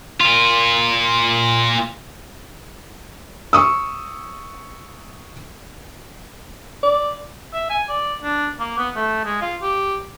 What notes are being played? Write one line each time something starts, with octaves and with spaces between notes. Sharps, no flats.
A#2 F4
C#6 D#6 E6
D5
E5
G#5
D5
D4
A#3
B3
A3
G#3
F4
G4